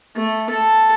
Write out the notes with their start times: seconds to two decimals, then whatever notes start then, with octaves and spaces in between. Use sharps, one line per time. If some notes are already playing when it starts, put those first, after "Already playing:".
0.15 A3
0.50 A4 A5